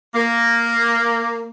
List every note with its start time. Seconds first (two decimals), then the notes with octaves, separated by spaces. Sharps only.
0.15 A#3